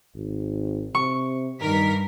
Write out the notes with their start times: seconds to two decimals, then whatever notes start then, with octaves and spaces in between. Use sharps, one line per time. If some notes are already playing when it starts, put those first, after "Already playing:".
0.15 G#1
0.95 C3 C#6
1.62 G2 D#3 A#4 B6